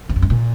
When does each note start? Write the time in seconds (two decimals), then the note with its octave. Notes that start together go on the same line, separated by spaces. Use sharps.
0.09 E2
0.16 F#2
0.22 G2
0.30 A#2